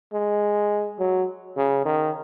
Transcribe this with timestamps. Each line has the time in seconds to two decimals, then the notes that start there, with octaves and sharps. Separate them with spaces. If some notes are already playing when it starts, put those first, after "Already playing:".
0.13 G#3
0.99 F#3
1.57 C#3
1.85 D#3